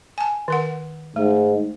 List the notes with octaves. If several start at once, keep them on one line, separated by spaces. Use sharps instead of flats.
G#5 A5
D#3 A#4 F#5
G#2 A3